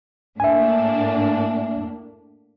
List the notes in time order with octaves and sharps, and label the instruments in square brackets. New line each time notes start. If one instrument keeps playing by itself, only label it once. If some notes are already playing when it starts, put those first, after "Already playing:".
[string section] A2 A#3 D4 [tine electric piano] E5 G#5